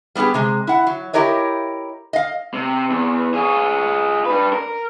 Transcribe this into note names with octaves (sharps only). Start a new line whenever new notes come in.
G3 B3 F4 G4 G#4
C3 G#3
E4 F#5
F#3
E4 G4 A#4 C#5 D#5
D#5 F5
C3
E2
F4 G#4
D4 B4
A#4